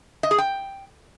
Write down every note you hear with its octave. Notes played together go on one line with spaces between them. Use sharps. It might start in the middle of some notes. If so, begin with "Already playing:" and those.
D#5
G#4
G5